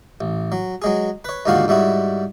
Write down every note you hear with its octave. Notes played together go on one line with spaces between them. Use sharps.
A1
F#3
F#3 G#3 G#4
B4 C#5
D#2 G#2 D3 F3 F#4 F5
G#2 G3 E4 F#4